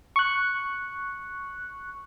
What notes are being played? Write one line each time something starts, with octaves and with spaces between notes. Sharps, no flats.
C#6 F#6